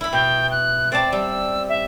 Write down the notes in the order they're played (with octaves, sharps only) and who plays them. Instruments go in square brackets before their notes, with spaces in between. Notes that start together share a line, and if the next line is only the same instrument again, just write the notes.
[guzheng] E4 B5 [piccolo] E6
[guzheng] B2 [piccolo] G5
[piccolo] F#6
[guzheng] C4 D5 A5 [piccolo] A6
[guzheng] G3 [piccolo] E6
[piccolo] E5